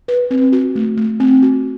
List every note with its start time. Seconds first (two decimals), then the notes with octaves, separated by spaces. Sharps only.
0.08 B4
0.31 C4
0.52 F#4
0.75 A3
0.97 A3
1.20 C4
1.42 F#4